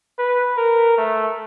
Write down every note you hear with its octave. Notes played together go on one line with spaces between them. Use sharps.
B4
A#4
A3